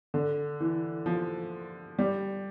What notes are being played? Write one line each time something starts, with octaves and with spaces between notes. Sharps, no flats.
D3
E3
F3
G3